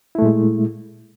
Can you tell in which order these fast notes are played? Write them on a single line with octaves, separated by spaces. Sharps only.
E4 A3 A#2 G#3